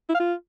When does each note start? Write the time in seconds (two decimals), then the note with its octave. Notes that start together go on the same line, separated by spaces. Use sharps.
0.09 E4
0.14 F5
0.20 F4